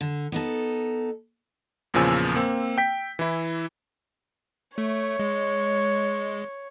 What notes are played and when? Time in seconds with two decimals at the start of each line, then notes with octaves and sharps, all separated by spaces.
0.01 D3
0.32 B3 D#4 A4
1.94 E2 A#2 C#3 F3 G#5 E6
2.36 A#3 C4
2.78 G5 B6
3.19 E3 E4
4.78 A3 C#5
5.20 G#3